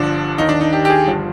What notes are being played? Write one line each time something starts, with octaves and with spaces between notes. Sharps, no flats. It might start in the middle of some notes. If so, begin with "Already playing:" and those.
Already playing: G1 G2 D3 F3 D4
D#2 D#3 D#4
D4
D#4
G4
G4
G#4
G1 G2 F3